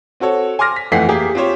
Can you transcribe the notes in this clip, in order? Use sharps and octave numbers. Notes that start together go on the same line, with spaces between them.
C4 F#4 A4 C#5
G#5 C6 D6 F6 A#6
B6
F2 E3 A3 F#5 B6 C7
A#3 G4 G#4
C4 F4 G4 C5 C#5